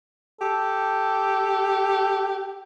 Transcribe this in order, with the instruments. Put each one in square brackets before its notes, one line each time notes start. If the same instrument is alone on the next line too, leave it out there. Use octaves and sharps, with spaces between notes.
[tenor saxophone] G4 [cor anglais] A4